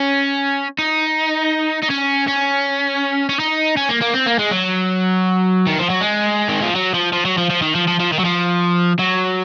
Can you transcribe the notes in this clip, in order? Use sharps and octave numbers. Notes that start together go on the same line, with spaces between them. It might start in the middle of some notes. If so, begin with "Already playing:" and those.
Already playing: C#4
D#4
D#4
C#4
C#4
C#4
D#4
C#4
A#3
A#3
C4
A#3
G#3
F#3
D#3
F3
F#3
G#3
D#3
F3
F#3
F3
F3
F#3
F3
F3
D#3
F3
F3
F3
D#3
F#3
F3
F#3